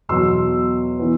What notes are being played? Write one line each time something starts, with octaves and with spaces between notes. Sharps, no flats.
E2 B2 F#3 C6 E6
E3 B3